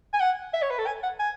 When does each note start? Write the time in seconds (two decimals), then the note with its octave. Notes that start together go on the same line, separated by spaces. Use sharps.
0.13 G#5
0.21 F#5
0.54 E5
0.62 C#5
0.70 B4
0.78 A4
0.87 G#5
1.03 F#5
1.20 G#5